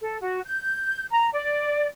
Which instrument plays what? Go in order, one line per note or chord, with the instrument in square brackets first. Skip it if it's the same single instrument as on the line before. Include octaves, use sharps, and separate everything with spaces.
[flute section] A4
F#4
G6
A#5
D5